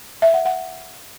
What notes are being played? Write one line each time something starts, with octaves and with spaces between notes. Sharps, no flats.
E5
F#5
F#5